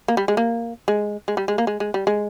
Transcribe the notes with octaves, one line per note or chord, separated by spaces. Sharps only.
A#3
G3
G#3
A#3
G#3
G#3
G3
G#3
A#3
G#3
G#3
G3
G#3